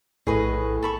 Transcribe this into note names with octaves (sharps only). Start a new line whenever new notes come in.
A#1 A2 G#4 B4 D#5
A4 B5 C#6